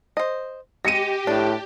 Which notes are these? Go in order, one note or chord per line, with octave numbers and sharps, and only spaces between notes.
C5 D#5
G#3 G4 A#6 C#7 D#7
A2 D4